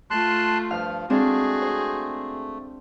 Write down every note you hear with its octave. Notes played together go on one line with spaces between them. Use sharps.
A3 F4 A5 C6 F#6
G2 F3 F5 F6
G#3 A3 C4 D4 F#4 G#4
C5